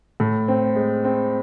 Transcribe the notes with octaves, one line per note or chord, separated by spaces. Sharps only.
A2
C4
G#3
C4